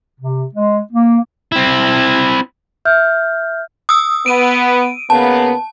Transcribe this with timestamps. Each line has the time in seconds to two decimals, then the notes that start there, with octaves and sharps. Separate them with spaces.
0.20 C3
0.54 G#3
0.92 A#3
1.52 C4 E4
2.85 E5 F6 G6
3.89 D#6 E6
4.26 B3 D7 D#7
5.10 C#3 A#3 B3 A5